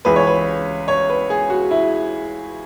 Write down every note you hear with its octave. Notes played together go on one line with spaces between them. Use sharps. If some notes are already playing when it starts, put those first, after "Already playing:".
C#2 C#3 E3 B4
C#5
B4
C#5
B4
G#4
F#4
E4